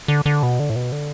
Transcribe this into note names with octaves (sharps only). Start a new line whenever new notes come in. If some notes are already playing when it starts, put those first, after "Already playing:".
D3
D3
B2
D3
A2
B2
D3